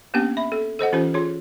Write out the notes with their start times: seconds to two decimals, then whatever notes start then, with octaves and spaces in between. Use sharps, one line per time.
0.14 A#3 B3 C#4 D4 G4 G5
0.37 E5 B5
0.52 A4
0.79 A4 C5 D#5 F#5
0.92 E3 C#4 F4 G4 C5
1.14 F4 G#4 C#5